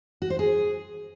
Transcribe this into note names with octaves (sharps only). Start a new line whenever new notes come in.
F#4
C5
G#4